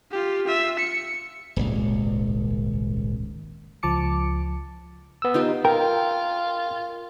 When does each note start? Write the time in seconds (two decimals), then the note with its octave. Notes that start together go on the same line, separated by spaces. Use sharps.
0.11 F4 G4
0.47 F4 E5
0.79 C#7
1.56 D#1 G#1 C#2
3.83 C#2 F3 A5 D6 C#7
5.22 B3 E6
5.34 D#4 F4 G4
5.65 F4 A#4 G5